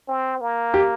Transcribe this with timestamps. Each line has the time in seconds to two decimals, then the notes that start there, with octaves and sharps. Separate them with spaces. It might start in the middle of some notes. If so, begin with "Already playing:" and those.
0.08 C4
0.41 A#3
0.74 G4